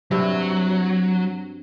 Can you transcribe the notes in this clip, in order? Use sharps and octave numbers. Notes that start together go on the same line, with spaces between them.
G2 C3 F#3